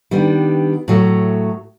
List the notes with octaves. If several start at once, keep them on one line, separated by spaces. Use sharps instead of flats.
D#3 G3 B3 D4
A2 F#3 A3